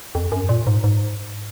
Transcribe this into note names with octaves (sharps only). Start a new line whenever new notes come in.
F2
F#2
A#2
G#2
G#2